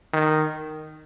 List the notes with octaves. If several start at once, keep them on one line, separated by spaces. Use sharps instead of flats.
D#3